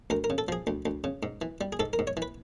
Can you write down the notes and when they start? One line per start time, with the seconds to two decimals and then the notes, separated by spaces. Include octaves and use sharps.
0.10 D2 A#4
0.24 A#4
0.30 C#3
0.38 A4
0.48 F3 G#4
0.67 D2
0.86 D2
1.04 C#3
1.23 G#2
1.42 E3
1.61 G3
1.72 G#4
1.80 G#2 A4
1.93 A#4
1.99 G#2
2.07 C#5
2.17 E3
2.22 B4